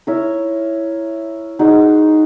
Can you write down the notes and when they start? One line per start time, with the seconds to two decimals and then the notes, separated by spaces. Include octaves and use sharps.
0.07 E4 A#4 C#5 E5
1.59 G#3 D#4 F#4